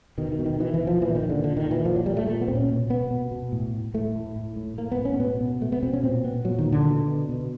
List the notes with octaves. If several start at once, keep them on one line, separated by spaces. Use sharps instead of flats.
B2 D#3
D#3
B2
D#3
B2 E3
E3
B2
F3
A#2 E3
D#3
A#2
D3
A#2 D3
D#3
A#2
E3
A#2 F3
F#3
A#2 G3
A3
A#2 A3
B3
A#2 C4
C#4
B2
B2 B3
B2
B2
A2
A2
A2 A3
A2
A2
A2
A2 A#3
B3
A2
C#4
B2 B3
B2
B2 A3
B3
B2 C4
C#4
A#2 C4
A#2 B3
A#2 F#3
D#3
A#2
D3
B2
B2
B2